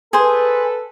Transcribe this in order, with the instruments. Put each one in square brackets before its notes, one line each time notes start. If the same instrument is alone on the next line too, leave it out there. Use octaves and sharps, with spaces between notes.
[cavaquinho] G#4 C5 [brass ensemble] A4 B4